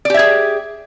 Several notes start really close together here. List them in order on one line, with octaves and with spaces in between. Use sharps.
D5 G4 E5 G#4